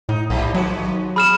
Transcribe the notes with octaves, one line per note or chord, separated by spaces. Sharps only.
A2 D#4
B1 G#2 F3 G3
G2 D#3 F#3 F#4
G#4 B5 F6 E7